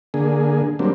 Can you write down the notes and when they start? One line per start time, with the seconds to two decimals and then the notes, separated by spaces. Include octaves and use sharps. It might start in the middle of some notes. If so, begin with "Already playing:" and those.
0.14 D3 A#3 G#4
0.79 F#3 G3 A#3 C4 D4